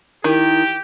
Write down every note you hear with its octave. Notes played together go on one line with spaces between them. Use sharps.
D#3 E4 G4